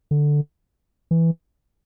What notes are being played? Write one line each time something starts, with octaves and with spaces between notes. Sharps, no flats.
D3
E3